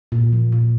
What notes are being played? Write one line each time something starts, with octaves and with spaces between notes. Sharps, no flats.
A#2
F3
A#2